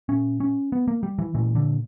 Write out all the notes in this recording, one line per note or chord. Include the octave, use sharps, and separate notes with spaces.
A#2 C#4
C#4
B3
A#3
G3
E3
A#2 E3
D3